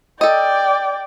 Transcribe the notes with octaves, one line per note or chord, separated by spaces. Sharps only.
A4 D5 D#5 G5